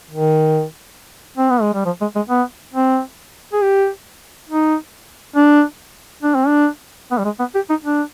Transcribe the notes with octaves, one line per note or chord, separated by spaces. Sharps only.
D#3
C4
B3
G#3
G3
F3
G#3
G#3
B3
C4
G#4
G4
D#4
D4
D4
C4
D4
B3
G3
G#3
B3
G4
D#4
D4